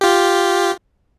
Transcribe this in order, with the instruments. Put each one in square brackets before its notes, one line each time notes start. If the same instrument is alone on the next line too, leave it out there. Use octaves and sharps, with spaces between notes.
[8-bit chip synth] F4 G4